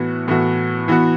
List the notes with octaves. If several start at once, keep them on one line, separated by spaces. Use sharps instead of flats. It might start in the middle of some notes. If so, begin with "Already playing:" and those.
Already playing: A2 E3 B3 F#4
A2 E3 B3 F#4
E3 B3 F#4